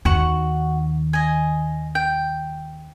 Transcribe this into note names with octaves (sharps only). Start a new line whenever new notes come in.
D#2 D#3 F#4 F#5 C#6
D#5 G#5
G5